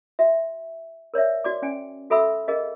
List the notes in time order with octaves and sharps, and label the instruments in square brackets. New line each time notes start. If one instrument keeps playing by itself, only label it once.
[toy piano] F#4 E5
A#4 C#5 D5 E5
F#4 D5 D6
C#4 D5 G5 G#5
F#4 A4 E5 B5 E6
G#4 A#4 D#5 F5